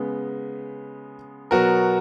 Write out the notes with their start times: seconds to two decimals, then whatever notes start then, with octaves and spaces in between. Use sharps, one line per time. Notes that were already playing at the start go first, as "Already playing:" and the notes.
Already playing: C#3 G#3 B3
1.51 B2 F#3 B3 F#4 A#4